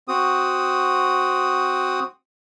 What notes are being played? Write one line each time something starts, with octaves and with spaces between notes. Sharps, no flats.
C4 F#4 D#6